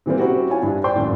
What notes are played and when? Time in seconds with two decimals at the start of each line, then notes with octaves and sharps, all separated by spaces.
0.06 C3 E3 G3 A#3 C4
0.19 C4 C#4 E4 F#4 G4
0.49 E4 F4 C#5 G#5
0.62 G2 D4 E4
0.84 C5 D5 G5 C6 G6
0.96 G#1 F#2 A2